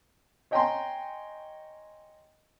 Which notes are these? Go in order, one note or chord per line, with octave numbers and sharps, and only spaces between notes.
C#5 D#5 G5 G#5 A#5 C6